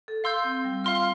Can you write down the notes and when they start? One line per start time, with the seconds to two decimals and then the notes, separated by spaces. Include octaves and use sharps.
0.08 A4
0.24 F5 C6 E6 G6
0.44 C4
0.64 G3
0.84 F4 F5 C6 F6